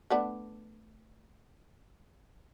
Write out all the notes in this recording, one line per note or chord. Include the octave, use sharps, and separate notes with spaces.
A3 B3 D4